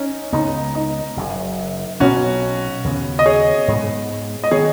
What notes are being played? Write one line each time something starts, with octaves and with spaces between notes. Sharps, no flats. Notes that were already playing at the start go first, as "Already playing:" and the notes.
Already playing: C#4 D#4
C#2 C#3 G#3 B3 D#4
D#4
F#1 F#2 C#3
B1 B2 B3 C#4 F#4
D#2 C#3 B3
D#5
G#4 C#5
G#2 G#3 B3
D#5
D#3 B3 G#4 C#5